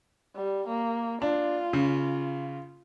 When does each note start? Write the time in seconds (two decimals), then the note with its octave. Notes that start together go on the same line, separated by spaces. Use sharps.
0.36 G3
0.68 A#3
1.22 D4 F4
1.73 C#3